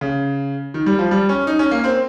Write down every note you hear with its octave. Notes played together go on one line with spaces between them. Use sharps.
C#3
D#3
G3
F3
G3
C#4
D#4
C#4
A#3
C4